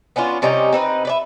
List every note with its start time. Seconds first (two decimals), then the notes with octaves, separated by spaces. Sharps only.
0.16 B3 C#4 D4 F4
0.42 C3 G3 C#4 D#4
0.73 C4 D#4 B4
1.05 B4 D5 E5